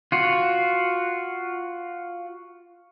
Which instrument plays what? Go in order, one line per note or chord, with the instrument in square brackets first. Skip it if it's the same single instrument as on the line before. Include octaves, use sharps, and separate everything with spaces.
[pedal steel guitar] F4 F#4